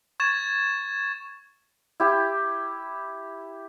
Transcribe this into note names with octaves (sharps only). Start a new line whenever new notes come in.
C#6 G#6 A6 E7
E4 G4